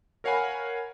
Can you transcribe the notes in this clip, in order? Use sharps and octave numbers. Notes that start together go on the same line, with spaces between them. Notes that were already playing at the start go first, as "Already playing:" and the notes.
A#4 C#5 F5 F#5 G#5 B5